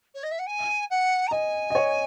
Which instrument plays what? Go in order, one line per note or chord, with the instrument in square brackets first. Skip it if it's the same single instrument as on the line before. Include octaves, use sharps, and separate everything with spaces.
[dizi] C#5
D#5
E5
F#5
G#5
F#5
A#5
[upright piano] D#5 [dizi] G#5
[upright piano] D#5
C#5